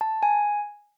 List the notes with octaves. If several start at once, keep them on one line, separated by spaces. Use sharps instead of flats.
A5
G#5